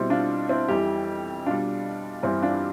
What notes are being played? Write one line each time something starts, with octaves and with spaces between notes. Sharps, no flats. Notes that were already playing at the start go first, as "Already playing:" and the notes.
Already playing: B2 G3 C4 E4
D4 F4
C4 E4
F2 E3 G3 E4 G4
B2 G3 D4 F4
G2 E3 G3 C4 E4
D4 F4